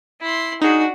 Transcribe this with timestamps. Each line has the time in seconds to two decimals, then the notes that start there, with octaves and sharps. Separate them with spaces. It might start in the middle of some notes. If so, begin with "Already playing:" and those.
0.21 E4 C6
0.61 D4 D#4 F#4 G#4